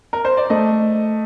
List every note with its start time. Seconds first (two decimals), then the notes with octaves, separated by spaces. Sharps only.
0.13 A#4
0.25 C5
0.37 D5
0.50 A3 D#5